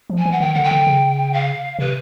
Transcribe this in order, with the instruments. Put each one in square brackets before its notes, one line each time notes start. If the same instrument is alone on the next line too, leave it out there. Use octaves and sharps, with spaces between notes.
[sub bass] F3
[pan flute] G#5
[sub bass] E3
[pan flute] F#5
[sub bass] D#3 [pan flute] G5
[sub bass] D3 [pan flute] F#5
[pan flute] G5
[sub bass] D3
C#3
[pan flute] F5
[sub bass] C3 [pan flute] B4